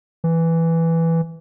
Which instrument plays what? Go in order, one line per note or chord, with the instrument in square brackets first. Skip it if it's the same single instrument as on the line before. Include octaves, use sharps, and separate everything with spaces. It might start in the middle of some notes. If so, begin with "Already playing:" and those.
[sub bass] E3